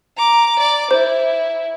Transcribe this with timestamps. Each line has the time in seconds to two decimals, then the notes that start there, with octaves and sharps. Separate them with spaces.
0.17 A#5 D6
0.59 D5 D6
0.91 E4 C5